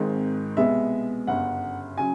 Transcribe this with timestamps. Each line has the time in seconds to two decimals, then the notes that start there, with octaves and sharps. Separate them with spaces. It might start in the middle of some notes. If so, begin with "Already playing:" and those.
Already playing: G#1 G#2 D#3 G#3 C4
0.57 C2 B2 G#3 B3 E5
1.27 G1 F#2 C#3 F#5
1.98 C#3 F#3 G#5